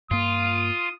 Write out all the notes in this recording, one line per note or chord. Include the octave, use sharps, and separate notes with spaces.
G2 A#3 F4 D#6